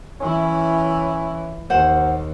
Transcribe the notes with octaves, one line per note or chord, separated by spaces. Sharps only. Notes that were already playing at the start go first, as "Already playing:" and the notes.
E3 C#4 E4
D#2 C5 F#5